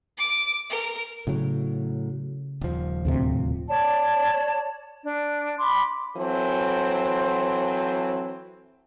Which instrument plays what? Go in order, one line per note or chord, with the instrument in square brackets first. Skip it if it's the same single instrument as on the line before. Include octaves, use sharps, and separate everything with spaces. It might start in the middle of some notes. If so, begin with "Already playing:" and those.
[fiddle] D6
A#4
[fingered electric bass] A2 F#3 [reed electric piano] C#3
[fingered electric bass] D#1 F3
[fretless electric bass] D2 A2 C3
[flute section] C#5 D5 A5
D4
B5 C6 D6
[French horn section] E3 F#3 C4 A4 C5